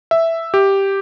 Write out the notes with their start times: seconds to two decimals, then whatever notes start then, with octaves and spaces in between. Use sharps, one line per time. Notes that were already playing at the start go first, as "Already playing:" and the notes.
0.11 E5
0.54 G4